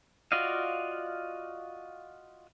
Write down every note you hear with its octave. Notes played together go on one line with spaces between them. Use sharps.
F4 F#4 D5 D#5 F5